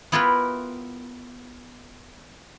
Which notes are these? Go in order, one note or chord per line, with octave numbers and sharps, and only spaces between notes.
B3 E4 F4 G4 A#4 B4